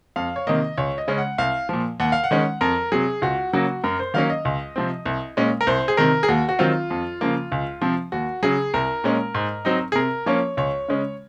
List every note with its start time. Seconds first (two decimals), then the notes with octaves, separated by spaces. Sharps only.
0.16 F2 F5
0.36 C#5
0.47 C3 D#3 A#3 D#5
0.77 C#2 C#5
0.98 D#5
1.08 C#3 G#3 C#4
1.18 F#5
1.38 C2 F5
1.69 A#2 F3
2.00 D#2 F#5
2.12 F5
2.24 F#5
2.31 D#3 G#3 C#4
2.61 F2 A#4
2.92 C3 F#3 G#4
3.22 C#2 F#4
3.53 C#3 F#3 A#3 F#4
3.84 F#2 A#4
4.00 C5
4.14 D#3 F#3 A#3 C#4 F5
4.30 D#5
4.45 C#2
4.76 C3 F3 C4
5.05 C2
5.37 A#2 G#3 C#4
5.61 A#4
5.67 C2 C5
5.88 G#4
5.97 C3 D#3 A#4
6.23 G#4
6.29 D#2 F#4
6.49 F#4
6.59 D#3 F#3 C4 F4
6.90 F2
7.21 C#3 F3 A#3
7.52 C#2
7.82 C3 F3 C4
8.12 D#2 F#4
8.43 C#3 F#3 G#4
8.74 C2 A#4
9.04 A#2 G#3 C#4
9.35 G#2
9.65 F#3 C4 D#4
9.92 G#4
9.95 C3 A#4
10.26 F3 A#3 C#4 C#5
10.57 C#2 C#5
10.88 C#3 G#3 C#4